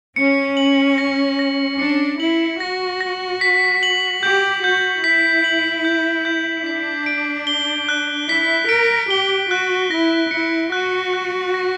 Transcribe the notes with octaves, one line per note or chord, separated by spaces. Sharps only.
C#4 C#7
F#7
A#6
A#6
D4 C#7
E4 F#7
F#4 A#6
A#6
B6
F#7
G4 G6
F#4 G6
E4 B6
F#7
G6
G6
D4 B6
D7
G7
F#6
E4 B6
A#4 D7
G4 G7
F#4 F#6
E4 A#6
E4 C#7
F#4 F#6
F#6
A#6